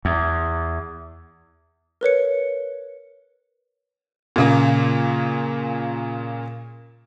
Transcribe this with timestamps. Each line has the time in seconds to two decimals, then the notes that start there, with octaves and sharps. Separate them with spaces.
0.05 E2
2.01 A#4 B4 C#5 C#7
4.36 A#2 C#3 A#3